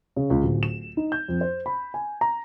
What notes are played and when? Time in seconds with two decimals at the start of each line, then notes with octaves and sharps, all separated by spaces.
0.16 C#3
0.30 C#2
0.43 D1
0.63 E7
0.97 D#4
1.12 G6
1.28 F2
1.41 C5
1.66 B5
1.94 G#5
2.21 A#5